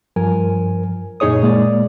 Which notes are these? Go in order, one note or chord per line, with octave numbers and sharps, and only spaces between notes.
G2 F3 A#4 G#5
F#2 A#2 D#4 G#4 C#5 D#6
A#2 G#3 A#3 D5